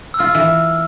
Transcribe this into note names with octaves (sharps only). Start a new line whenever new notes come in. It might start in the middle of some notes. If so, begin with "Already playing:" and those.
E6
F4 F6
E3